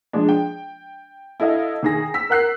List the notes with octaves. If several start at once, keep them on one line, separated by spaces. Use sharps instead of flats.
F3 G#3 D4
G5
E4 A4 D#5 F5
D#3 G#4 A#6
E6 B6
A#4 F#5 F#6 C7